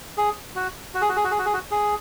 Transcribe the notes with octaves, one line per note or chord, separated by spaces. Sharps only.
G#4
F#4
F#4
G#4
F#4
G#4
F#4
G#4
F#4
G#4
F#4
G#4